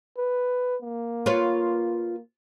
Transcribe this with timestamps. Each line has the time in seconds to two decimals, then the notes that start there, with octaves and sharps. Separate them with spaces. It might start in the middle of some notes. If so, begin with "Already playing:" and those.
0.18 B4
0.82 A#3
1.26 F4 B4 C#5